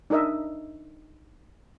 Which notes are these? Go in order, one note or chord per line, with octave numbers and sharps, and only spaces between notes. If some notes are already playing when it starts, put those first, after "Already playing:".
D4 D#4 A#4 D#5 E5